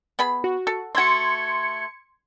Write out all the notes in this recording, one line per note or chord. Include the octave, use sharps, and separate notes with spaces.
B3 G#4 B5
F#4
A4
A3 F#4 C6 G#6 C#7